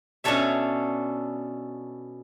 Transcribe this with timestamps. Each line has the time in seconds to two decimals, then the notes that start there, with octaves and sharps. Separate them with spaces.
0.24 B2 C#4 D4 A4 C#5 E5